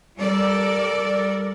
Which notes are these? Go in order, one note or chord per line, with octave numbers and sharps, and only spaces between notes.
G3 A4 A#4 D5